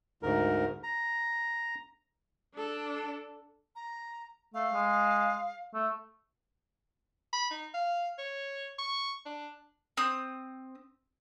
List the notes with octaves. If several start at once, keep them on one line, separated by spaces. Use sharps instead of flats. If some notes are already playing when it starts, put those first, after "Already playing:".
D2 G#2 A#4
A#5
D4 A4
A#5
A3 F5
G#3
A3
B5
D#4
F5
C#5
C#6
D4
C4 D#6